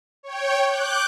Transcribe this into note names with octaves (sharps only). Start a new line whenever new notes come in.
C#5 G5
D6 F#6 G6